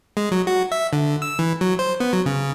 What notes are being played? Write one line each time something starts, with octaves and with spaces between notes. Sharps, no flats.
G#3
F#3
F#4
E5
D3
E6
E3
F#3
C5
B3
F#3
C#3